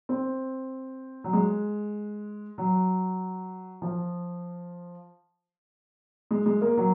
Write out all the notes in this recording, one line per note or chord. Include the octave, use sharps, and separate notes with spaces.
C4
F#3
G#3
F#3
F3
G#3
G#3
A#3
F#3